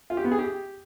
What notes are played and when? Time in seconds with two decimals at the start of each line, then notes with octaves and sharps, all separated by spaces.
0.10 F4
0.17 G4
0.24 B3
0.32 G#4
0.39 G4